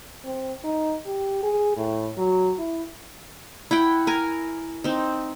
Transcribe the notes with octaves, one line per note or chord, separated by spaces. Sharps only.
C4
D#4
G4
G#4
A2
F#3
E4
E4 F#5 G5
A#4 G#5
C4 D#4